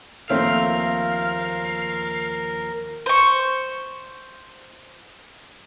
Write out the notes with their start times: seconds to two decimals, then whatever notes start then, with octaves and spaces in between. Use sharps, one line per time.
0.30 D#2 F3 A3 C4 A#4 F5
3.06 C5 C#6